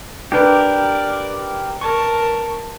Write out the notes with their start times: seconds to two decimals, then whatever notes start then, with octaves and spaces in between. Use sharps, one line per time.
0.32 D4 G4 A#4 B4 D5
1.81 A#4 A5 C#6